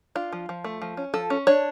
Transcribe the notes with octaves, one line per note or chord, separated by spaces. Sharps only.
D4 F4
F3
F3
A3
F3
C#4
F3 A4
C#4
D4 C#5